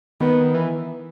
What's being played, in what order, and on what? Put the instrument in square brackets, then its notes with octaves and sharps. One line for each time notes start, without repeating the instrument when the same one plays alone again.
[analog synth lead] D#3 [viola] B3
[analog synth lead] E3